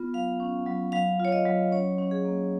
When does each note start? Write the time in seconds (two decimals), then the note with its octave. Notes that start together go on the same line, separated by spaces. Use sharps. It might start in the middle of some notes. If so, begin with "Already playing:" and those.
Already playing: B3 F4
0.14 F#3 F5
0.40 C#4
0.66 F#3
0.92 F#3 F5
1.20 F4 C#5
1.32 D#5
1.45 F#3
1.72 C#4 C#5
1.98 C#4
2.11 G#4
2.25 A#3